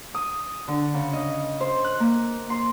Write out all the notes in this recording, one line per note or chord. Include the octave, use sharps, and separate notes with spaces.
D#6
D3
C#3
D#5
C5
F#6
A#3
C6